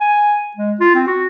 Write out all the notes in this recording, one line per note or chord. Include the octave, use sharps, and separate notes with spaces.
G#5
G#3
F4
C4
F#4